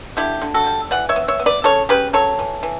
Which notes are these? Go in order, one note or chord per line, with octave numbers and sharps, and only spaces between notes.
D3 E4 G4
D3
F#4 A4
G3
E3 D5 F#5
C#5 E5
B3
C#5 E5
B3
B4 D5
C#3 A4 C#5
C#3 G4 B4
F#3 A4 C#5
E3
E3